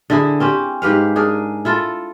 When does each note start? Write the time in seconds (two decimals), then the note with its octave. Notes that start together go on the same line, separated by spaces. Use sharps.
0.10 D3 E4 G#4
0.40 C4 C#4 G4
0.82 G#2 G4 B4 F5
1.16 D4 G#4 A#4
1.65 E4 F4 A4